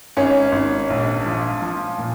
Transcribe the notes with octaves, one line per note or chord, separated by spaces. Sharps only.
G#1 C#4
G#1
A#1
F3
F3
A#2